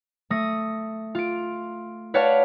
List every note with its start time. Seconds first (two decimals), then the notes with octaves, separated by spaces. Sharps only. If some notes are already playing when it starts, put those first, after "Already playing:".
0.30 A3 D#6 A#6
1.15 F4 D7
2.14 B4 C#5 D5 F5 F#5 A5